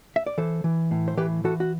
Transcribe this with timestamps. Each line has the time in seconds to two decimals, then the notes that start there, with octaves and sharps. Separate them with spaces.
0.16 E5
0.27 D5
0.38 E3 A4 C5
0.64 E3
0.91 A2
1.08 C5
1.17 E3 G4 B4
1.44 E3 F#4 A4
1.60 F#4